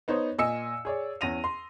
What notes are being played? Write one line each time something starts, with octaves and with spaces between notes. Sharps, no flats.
B3 D#4 C5 C#5
A#2 D#5 G#5 E6 C#7
G#4 C#5 D5
E2 C#4 A#6 D#7 F7
C6